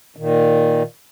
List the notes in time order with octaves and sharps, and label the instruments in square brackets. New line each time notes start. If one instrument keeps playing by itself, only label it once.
[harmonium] A#2 D#3